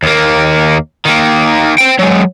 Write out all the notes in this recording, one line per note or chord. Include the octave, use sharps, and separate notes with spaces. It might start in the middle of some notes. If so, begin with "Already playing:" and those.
D#2 A#3
D#3 A#3
C5 G5
F#3 G#3